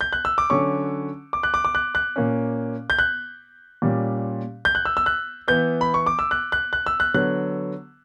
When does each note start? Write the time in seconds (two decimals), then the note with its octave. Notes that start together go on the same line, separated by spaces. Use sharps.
0.01 G6
0.13 F#6
0.25 E6
0.38 D6
0.50 D3 F#3 C#4 C#6
1.33 D6
1.43 F#6
1.54 D6
1.65 D6
1.75 F#6
1.95 F#6
2.16 A#2 A#3 C#4
2.90 G6
2.99 F#6
3.82 A#2 G3 C#4
4.65 G6
4.75 F#6
4.85 E6
4.97 E6
5.06 F#6
5.48 E3 B3 G6
5.81 B5
5.94 C#6
6.06 D6
6.19 E6
6.31 F#6
6.52 F#6
6.73 F#6
6.86 E6
7.00 F#6
7.14 D3 F#3 B3 F#6